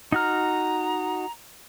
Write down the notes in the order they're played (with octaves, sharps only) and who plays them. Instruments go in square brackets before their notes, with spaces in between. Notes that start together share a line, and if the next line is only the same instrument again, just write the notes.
[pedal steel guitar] D#4 F#4 F6 [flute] A#5